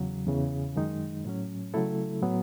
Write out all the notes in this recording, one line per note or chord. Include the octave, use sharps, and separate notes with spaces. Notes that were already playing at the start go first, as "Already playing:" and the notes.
Already playing: E2 C#3 F#3
E2 C#3 E3
F#2 D#3 G#3 D#4
A2 F#3 C#4
C#3 F#3 A3 E4 A4
A2 F#3 B3